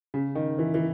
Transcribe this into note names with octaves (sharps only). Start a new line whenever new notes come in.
C#3
D#3
E3
E3